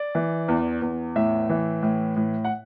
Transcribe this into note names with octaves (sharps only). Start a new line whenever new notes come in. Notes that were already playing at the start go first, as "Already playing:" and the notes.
Already playing: D5
E3
E2
E2
A2 E5
E3
A2
A2
F#5